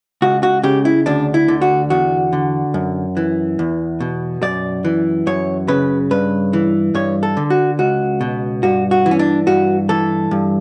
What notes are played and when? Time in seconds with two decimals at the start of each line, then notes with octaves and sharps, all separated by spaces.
0.22 C#2 F#4
0.43 F#4
0.63 C#3 G4
0.85 E4
1.06 D2 D4
1.34 E4
1.48 D3
1.62 F#4
1.90 E2 F#4
2.33 D3
2.74 F#2
3.17 E3
3.59 E2
4.00 B2
4.42 F#2 D5
4.85 E3
5.27 F#2 C#5
5.68 C#3 B4
6.11 G2 B4
6.53 E3
6.94 G2 C#5
7.23 A4
7.37 D3
7.50 F#4
7.79 C#2 F#4
8.21 B2
8.63 G2 F#4
8.91 F#4
9.06 E3
9.11 C#4
9.19 D4
9.47 G2 F#4
9.89 E3 A4
10.31 G2